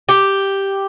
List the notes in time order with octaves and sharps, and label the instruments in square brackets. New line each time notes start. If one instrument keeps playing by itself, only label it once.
[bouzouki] G4